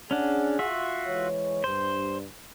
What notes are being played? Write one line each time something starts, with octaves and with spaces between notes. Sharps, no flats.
C#4 D4 G#4 F#5
F4 F#4 E5
E3 G#3 C#5
G2 C5